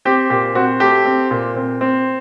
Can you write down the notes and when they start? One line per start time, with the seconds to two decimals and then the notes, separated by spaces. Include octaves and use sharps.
0.05 C4 G4
0.30 A#2 G4
0.55 C4 F#4
0.80 A3 G4
1.06 C4
1.31 A#2
1.56 C4
1.81 C4